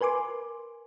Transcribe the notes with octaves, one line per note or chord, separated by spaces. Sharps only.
A#4 B4 G#5 C6 D6